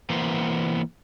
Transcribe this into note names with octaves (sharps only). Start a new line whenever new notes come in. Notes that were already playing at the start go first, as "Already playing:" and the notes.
E3 A#3 B3 C5